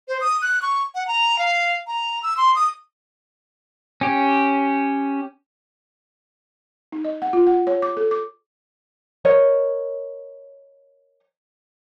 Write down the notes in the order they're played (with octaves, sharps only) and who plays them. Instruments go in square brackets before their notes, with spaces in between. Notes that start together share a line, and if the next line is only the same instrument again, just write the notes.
[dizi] C5
D#6
F#6
C#6
F#5
A#5
F5
A#5
E6
C6
D#6
[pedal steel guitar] C#4 G4
[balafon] D#4
D#5
F#5
F4
F#5
C#5
D6
A4
D6
[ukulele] A#4 C#5 D#5